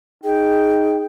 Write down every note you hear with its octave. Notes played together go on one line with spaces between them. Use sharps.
D#4 G#4 G5